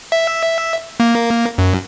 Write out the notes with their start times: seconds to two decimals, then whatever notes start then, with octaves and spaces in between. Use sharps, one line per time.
0.12 E5
1.00 A#3
1.58 F#2